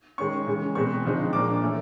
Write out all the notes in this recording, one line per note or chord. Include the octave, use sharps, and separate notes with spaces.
D#3 G#3 C#4 C#6
C#3 E3 G#3
B2 G#3 C4 C#6
D3 F3 G#3 C4 D#4
A#2 F3 A#3 D4 D6
E3 A3 C#4